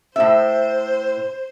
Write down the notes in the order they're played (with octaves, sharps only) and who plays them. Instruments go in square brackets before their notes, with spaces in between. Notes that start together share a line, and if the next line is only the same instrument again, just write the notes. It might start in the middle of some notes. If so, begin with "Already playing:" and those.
[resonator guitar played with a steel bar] A2 E5 [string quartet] C5